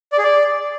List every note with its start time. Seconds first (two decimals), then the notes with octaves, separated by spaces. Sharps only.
0.12 D5
0.18 G#4
0.24 D5